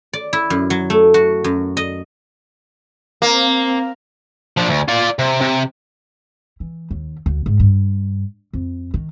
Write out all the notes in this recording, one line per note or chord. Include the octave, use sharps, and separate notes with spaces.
D5
E4
F#2
F#3
A3
F#4
F#2
D#5
A#3 C4
F3 D4
D2
F4 D5
C3
C3
E3
D#2
D2
G#2
G2
F2
D#3